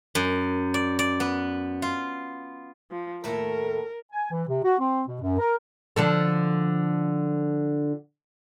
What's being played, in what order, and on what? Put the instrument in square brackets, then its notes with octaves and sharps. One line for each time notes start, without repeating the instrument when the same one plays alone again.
[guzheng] F#2
D5
D5
B3
F4
[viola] F3
[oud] D#2 A2 A3 [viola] A#4
[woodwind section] G#5
E3
C3
F#4
C4
B2
F#2
A#4
[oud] D3 F3 A4